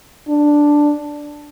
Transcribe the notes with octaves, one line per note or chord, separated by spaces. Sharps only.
D4